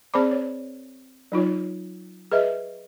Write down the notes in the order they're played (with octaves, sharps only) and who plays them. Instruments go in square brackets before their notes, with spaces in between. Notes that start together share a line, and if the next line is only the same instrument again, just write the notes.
[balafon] C4 G#4 C5 D5 B5 D6
C#5
F#3 D#4 F4 C#5
G#4 B4 D#5 E5